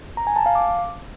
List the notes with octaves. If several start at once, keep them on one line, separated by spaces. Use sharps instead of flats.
A#5
G#5
A5
F5
D6